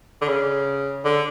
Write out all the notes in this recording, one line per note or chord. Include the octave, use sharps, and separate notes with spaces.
D3
C#3
D3